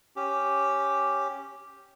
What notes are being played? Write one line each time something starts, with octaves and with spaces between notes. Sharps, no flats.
C#4 G4